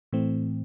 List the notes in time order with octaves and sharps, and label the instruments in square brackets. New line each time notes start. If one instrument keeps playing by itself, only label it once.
[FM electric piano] A2 E3 A3 C4